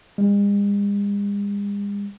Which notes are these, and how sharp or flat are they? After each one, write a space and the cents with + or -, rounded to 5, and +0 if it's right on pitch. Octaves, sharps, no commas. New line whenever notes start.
G#3 -45